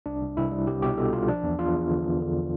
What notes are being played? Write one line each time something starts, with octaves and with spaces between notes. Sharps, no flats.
C2 D4
C2
C2 E4
G3
C2 G4
B2 G4
B2 A4
C2 F4
F3 D4
E2
E2 F4
E2
D3
E2
D3